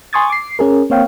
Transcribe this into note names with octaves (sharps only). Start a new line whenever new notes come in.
G#5 C6 C#6 D#6 G#6 A6
D6 C7
C#4 G#4 A#4
A#3 C4 C#5 F5 G5